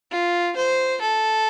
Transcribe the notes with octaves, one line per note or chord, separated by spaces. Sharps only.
F4
C5
A4